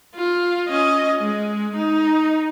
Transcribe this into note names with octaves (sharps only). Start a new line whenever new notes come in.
F4
C#4 D#5
G#3
D#4